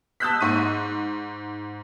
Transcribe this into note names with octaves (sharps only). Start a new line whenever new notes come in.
A5 D#6 E6 F#6 G6 B6
G#2 C#6 D#7